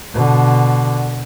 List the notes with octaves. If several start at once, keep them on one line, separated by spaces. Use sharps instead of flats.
B2 D3